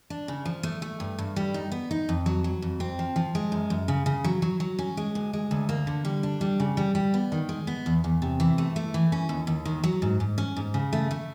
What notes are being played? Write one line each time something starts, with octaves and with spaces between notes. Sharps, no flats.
D4
C#3
F3
A3
A3
G2
G2
G3
D#4
B3
D#4
F2
F#3
F#3
F2
C4
F3
F3
G#3
F#2
F#2
C#3
C#3
F#3
F#3
F#3
C#4
G#3
D2
G#3
D2
A#3
D3
G3
D4
G3
C#3
G3
G3
B3
D#3
G#3
B3
E2
E2
C3
E3
A3
A3
E3
C#4
D#2
D#2
D#3
F#3
G#2
G#2
C#4
G#2
C#3
A3
A3